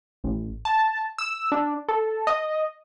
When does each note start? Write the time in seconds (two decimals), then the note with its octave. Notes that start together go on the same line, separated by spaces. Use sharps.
0.24 A1
0.65 A5
1.18 E6
1.52 D4
1.89 A4
2.27 D#5